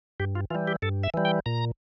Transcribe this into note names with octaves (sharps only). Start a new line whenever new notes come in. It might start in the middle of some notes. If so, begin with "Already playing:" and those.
G2 G4
F4
E3 G3 F4
G4
G2 A4
E5
E3 G3
G5
A#2 A#5